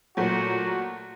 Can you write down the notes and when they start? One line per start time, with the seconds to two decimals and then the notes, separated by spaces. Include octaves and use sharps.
0.17 A#2 F#3 A3 F#4